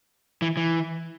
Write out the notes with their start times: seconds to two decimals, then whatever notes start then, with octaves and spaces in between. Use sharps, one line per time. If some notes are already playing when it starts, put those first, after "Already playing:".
0.42 E3
0.57 E3